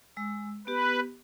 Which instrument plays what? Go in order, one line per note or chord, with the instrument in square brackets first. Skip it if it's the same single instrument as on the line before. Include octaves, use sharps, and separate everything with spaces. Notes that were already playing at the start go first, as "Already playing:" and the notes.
[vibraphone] G#3 E6
[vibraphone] B3 G4 [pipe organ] B4